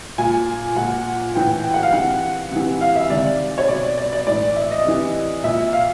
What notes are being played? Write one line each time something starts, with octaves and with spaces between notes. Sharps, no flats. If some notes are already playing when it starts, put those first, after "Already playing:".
A#2 G#5
A#2 F#5
A2 E3 G5
G5
F#5
F5
C3 E3 F#5
C3 E3
F5
E5
C3 D#3 D5
C#5
B2 D5
D5
D5
A2 E3 D5
E5
D#5
C3 E3
A#2 E5
F5